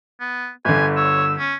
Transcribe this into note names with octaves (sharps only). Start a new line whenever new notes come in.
B3
G1 D3 G#5
C#5 E6
C#4